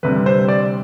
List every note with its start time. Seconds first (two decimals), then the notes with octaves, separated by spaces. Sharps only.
0.03 D2 C3 G3 B4
0.26 C5
0.48 D5